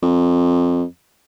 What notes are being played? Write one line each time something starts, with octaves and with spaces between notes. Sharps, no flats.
F2